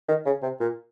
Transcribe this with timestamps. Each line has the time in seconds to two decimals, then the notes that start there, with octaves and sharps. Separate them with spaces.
0.09 D#3
0.26 C#3
0.43 C3
0.60 A#2